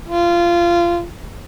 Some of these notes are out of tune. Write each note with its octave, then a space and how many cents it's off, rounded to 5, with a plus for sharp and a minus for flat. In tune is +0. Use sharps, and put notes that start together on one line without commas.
F4 -20